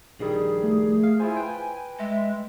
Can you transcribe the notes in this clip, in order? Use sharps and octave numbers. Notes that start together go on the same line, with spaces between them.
A#1 D#3 G3 G#4
A3
F5
E4 F4 C5 G#5
B4 G5
G#3 E5